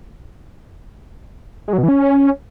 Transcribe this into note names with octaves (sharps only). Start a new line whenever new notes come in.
G#3
F#3
B2
E3
C#4